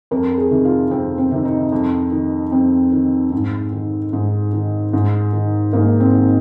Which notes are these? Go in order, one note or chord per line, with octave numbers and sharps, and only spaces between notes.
F2 A#4
G#4
C3 D#3
F4
F2 C4
C4
C3 D#3
D#4
F2
D#3
F2 C4
D#3
G#2
D#3
G#2
D#3
G#2
D#3
G#2 A#3
C4
D#3